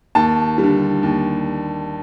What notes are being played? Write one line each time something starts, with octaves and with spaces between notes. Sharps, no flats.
D#2 A5
G3
D3
D#2